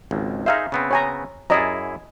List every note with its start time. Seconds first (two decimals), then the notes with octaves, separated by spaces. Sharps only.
0.11 G#1 C#2
0.46 D#4 G#4 C5 E5 F5 A#5
0.72 C#3 B3 C4
0.91 C#5 G#5 A#5
1.50 F#2 E4 G#4 D5 D#5 A#5